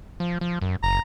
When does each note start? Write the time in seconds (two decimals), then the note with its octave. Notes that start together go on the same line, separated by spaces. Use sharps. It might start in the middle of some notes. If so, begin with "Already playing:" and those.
0.20 F3
0.41 F3
0.62 F#2
0.83 F#1 A#5